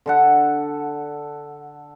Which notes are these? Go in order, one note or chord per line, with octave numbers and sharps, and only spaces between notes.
D3 A4 F#5